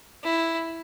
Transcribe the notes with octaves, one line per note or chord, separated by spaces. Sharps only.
E4